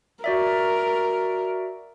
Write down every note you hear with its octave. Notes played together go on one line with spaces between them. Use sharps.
F#4 A#4 D5 E5